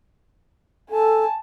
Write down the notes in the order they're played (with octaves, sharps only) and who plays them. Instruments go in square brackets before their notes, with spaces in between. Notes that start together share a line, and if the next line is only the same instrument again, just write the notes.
[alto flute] A4 [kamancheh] G#5 A5